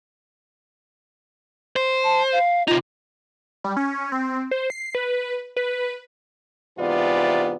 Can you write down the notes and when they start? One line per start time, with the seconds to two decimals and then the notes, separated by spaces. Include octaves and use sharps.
1.76 C5
2.04 A5
2.32 F5
2.68 C3 D#4 F4
3.64 G3
3.77 C#4
4.12 C4
4.51 C5
4.70 C7
4.95 B4
5.56 B4
6.78 G#2 C3 E3 B3 F4 D5